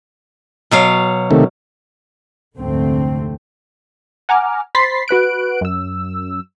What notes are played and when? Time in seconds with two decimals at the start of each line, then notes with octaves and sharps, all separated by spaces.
0.71 B2 F#3 F5
1.31 C3 D#3 A3
2.57 F1 D2 G#2 D3 A3 C4
4.29 F#5 G#5 A#5 D6 F6
4.75 C5 B5 C6 A6 B6 C7
5.08 F#4 B4 F#6 D7
5.61 F#2 E6